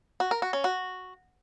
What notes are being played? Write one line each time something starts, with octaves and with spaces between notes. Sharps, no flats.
F#4
A#4
F#4
C#4
F#4